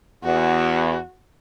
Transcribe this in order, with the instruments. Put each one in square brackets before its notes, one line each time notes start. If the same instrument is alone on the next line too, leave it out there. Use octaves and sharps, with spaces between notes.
[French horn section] E2 [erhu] F#4